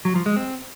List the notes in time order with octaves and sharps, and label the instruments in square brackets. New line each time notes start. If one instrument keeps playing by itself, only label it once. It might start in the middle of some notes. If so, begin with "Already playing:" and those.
[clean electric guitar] F#3
F3
G#3
C4